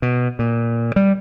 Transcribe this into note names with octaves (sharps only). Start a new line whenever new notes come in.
B2
A#2
G3